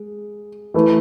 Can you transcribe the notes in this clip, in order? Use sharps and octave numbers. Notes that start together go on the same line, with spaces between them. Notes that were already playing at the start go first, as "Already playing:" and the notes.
Already playing: G#3
E3 A3 E4 B4